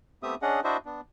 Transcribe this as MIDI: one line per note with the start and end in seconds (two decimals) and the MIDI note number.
0.23 0.35 57
0.23 0.35 59
0.23 0.35 60
0.23 0.35 67
0.23 0.35 76
0.23 0.35 87
0.42 0.60 61
0.42 0.60 62
0.42 0.60 68
0.42 0.60 75
0.42 0.60 78
0.64 0.77 62
0.64 0.77 64
0.64 0.77 66
0.64 0.77 72
0.64 0.77 75
0.64 0.77 76
0.86 1.01 59
0.86 1.01 62